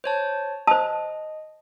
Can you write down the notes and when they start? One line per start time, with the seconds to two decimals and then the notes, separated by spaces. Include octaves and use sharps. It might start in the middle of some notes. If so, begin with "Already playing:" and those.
0.04 C5 C#5 A5
0.67 C5 D#5 A5